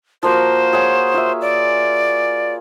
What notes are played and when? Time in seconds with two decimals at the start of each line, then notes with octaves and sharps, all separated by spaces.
0.23 F3 A#3 F#4 C5
0.73 G#4 C#5 F#5
1.14 F4 E5
1.41 D5